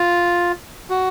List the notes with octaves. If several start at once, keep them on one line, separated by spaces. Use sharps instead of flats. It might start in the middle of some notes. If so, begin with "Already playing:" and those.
Already playing: F4
F#4